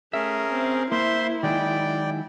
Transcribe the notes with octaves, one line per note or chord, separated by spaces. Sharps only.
A3 C#4 G#4 A#4 E5
C4
A#3 E4 C5 E5 C6
D#3 F#3 G#3 D5 G5